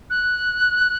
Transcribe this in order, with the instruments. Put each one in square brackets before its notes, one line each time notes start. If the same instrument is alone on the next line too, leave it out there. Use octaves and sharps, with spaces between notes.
[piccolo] F#6